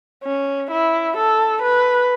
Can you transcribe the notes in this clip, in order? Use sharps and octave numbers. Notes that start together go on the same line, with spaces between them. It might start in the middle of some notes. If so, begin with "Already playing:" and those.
C#4
E4
A4
B4